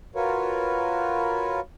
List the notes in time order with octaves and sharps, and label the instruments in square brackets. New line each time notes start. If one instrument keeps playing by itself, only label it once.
[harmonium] F4 F#4 A#4 B4 C#5